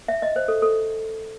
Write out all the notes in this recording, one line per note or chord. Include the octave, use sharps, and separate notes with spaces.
E5
D#5
C5
A4
A4